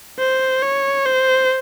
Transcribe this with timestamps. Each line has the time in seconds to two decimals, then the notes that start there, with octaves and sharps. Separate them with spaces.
0.19 C5
0.62 C#5
1.05 C5